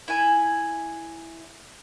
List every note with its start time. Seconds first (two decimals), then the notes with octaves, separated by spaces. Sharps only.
0.08 E4 G#5